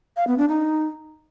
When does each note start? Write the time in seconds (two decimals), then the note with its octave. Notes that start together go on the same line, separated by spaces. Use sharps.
0.17 F5
0.27 B3
0.38 D4
0.49 D#4